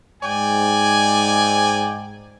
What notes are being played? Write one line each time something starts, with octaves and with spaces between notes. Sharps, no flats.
G#2 D5 G5 G#5